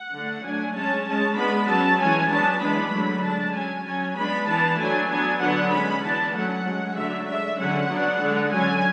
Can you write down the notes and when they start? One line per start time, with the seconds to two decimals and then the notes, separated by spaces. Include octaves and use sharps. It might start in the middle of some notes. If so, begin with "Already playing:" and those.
Already playing: F#5
0.13 D3 A3 D4
0.44 F#3 A3 D4 G#5
0.75 G#3 C#4 A5
1.06 G#3 C#4 A5
1.37 G#3 B3 D4 B5
1.68 F#3 C#4 A5
2.00 E3 G#3 C#4 G#5
2.30 F#3 B3 D4 A5
2.61 E3 G#3 B3 D4 B5
2.93 D3 F#3 A3 D4
3.23 G#3 D4 A5
3.55 F#3 C#4 G#5
3.85 F#3 C#4 G#5
4.16 G#3 B3 D4 B5
4.48 E3 B3 D4 A5
4.79 F#3 A3 D4 G#5
5.10 F#3 B3 D4 G#5
5.41 D3 F#3 B3 D4 F#5
5.72 G#3 C#4 B5
6.03 E3 B3 D4 A5
6.34 F#3 A3 C#4 F#5
6.65 G#3 C#4
6.96 D3 F#3 A3 D4 E5
7.28 G#3 D4 E5
7.59 D3 F#3 C#4 F#5
7.90 F#3 B3 D4
8.21 D3 G#3 D4
8.52 D3 F#3 C#4 G#5